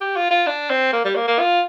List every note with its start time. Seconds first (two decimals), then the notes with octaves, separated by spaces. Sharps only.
0.01 G4
0.16 F4
0.31 F4
0.47 D4
0.70 C4
0.93 A#3
1.05 G3
1.16 A#3
1.27 A#3
1.40 F4